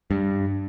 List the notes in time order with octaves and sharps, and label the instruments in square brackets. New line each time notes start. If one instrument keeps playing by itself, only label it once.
[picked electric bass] G2